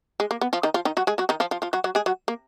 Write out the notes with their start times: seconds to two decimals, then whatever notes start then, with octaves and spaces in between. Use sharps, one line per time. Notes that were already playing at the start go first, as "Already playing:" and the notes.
0.20 G#3
0.31 A#3
0.41 B3
0.53 F3 F4
0.63 D#3 D#4
0.74 F3 F4
0.85 D#3 D#4
0.97 F#3 F#4
1.07 G#3 G#4
1.18 F#3 F#4
1.29 D#3 D#4
1.40 F3 F4
1.51 F3 F4
1.62 F3 F4
1.73 F#3 F#4
1.84 F#3 F#4
1.95 G#3 G#4
2.06 F#3 F#4
2.28 A#3